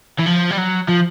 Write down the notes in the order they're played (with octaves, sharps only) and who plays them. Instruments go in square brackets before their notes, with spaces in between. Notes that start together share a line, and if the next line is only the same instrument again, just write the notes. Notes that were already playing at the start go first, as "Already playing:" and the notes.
[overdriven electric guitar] E3
F3
G3
F#3
F3